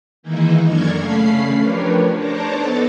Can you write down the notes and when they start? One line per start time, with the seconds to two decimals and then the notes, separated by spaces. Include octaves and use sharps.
0.23 D#3 E3 G#3 A#3 D#4 E4
0.65 F#2 D4 A4 A#4 C#6 G#6
0.98 C#3 A3 C#4 F5 B5 C7
1.57 F3 D4 G4 A#4 B4 C#5
2.16 D4 C5 C#5 A5 A#5 D6
2.48 B3 D#4 A4 A5